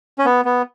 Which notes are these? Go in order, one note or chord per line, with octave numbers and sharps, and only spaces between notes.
C#4
B3
B3